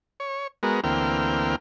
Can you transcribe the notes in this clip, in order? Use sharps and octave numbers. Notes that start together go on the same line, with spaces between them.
C#5
G#3 B3 F#4 A#4
D2 E3 A#3 C4 G5 F6